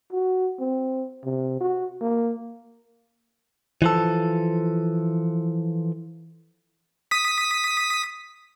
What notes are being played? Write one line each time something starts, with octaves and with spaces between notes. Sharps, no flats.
F#4
C4
C3
F#4
A#3
E3 F3 A4
D#6 B6